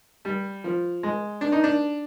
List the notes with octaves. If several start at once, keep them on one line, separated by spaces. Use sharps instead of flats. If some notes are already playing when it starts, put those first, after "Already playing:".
G3
F3
G#3
D4
D#4
D4